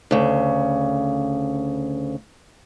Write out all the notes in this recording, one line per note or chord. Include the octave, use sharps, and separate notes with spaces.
D2 C#3